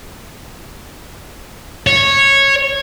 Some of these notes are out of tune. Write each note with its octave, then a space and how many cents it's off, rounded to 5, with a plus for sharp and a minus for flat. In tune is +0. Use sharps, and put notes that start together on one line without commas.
C#5 -10